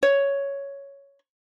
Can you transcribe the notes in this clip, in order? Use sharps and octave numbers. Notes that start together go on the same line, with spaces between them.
C#5